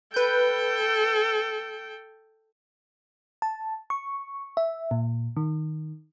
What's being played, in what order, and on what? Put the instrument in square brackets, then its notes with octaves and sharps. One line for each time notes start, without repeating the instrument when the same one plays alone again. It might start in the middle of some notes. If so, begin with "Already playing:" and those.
[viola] A4 G5 [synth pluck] B4 G6
[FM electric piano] A5
C#6
E5
A#2
D#3